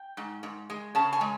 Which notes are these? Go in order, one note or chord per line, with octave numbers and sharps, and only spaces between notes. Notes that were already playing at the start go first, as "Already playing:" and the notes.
Already playing: G5
G#2
G#2
G#3
C#3 A5
G#5
G#3